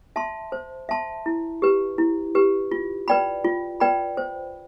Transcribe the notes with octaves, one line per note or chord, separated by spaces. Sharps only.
E5 A5 C6
C5
E5 A5 C6
E4
G4 B4
E4
G4 B4
F4
B4 D5 G5 B5
F4
B4 D5 G5 B5
C5